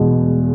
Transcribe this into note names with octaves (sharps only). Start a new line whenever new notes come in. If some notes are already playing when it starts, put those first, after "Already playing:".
Already playing: E2 B2 G#3